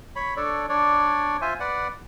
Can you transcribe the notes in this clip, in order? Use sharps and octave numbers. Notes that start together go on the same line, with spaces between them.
C#5 B5
D4 A4 C#5 D5
D4 C#5 D5
F4 C5 E5 G#5
B4 D5 F#5